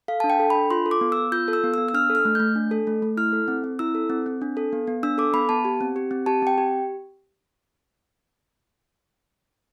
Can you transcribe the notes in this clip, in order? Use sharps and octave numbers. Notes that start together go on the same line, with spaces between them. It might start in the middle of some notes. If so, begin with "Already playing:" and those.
A4 F5
D4 A5
G5
A4
B5
D4
F4 C6
A4
D6
B3
E6
B3
F4 G6
A4
E6
B3
E6
B3
E6
D4 F6
A4
F6
A3
A3 G6
D4
A4
A3
A3
E4 F6
A4
C4
C4
E4 E6
A4
C4
C4
D4
A4
B3
B3
D4 E6
A4 D6
B3 B5
B3 A5
G4
C4
G4
C4
G4 A5
C4 G5
G4